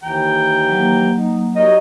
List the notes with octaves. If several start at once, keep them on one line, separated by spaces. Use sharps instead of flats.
D#2 E3 G5 A#5
F#3 A#3
D#4
F#3 G3 D#4 A#4 C#5 D#5